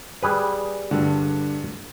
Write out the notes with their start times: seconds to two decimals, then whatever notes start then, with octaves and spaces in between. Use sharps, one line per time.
0.22 G3 G#4 B4
0.91 G2 D3